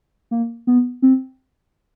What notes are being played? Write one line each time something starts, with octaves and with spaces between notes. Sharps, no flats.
A#3
B3
C4